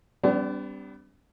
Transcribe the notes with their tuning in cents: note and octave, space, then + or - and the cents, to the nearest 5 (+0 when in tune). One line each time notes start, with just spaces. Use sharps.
G3 +0 B3 +35 D4 -30